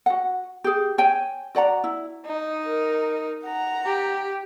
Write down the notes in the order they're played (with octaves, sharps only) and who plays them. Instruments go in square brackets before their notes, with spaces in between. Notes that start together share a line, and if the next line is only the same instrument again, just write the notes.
[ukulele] F#4 F#5
G4 G#4
C#5 G5 G#5
F#4 D5 F#5 A#5
E4
[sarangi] D#4
[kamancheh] A#4
F#5 A#5
[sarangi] G4